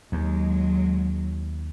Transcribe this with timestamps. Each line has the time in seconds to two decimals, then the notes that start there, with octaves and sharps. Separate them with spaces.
0.12 D#2 F#3 G#3